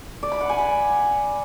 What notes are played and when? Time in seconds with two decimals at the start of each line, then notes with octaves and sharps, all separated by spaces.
0.23 D5
0.32 B5
0.41 F#5
0.49 G#5
0.58 B5